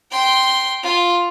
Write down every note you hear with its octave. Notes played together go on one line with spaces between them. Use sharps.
G5 C6
F4